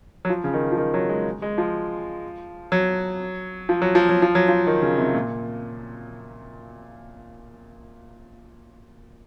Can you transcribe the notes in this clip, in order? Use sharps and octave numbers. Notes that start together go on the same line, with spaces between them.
F#3
F3
C#3
D#3
F3
D#3
F#3
G#3
G#3
F3
F#3
F3
F#3
F3
F#3
F3
F#3
F3
D#3
C#3
C3
A#2